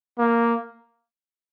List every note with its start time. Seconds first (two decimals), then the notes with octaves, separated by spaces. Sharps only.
0.18 A#3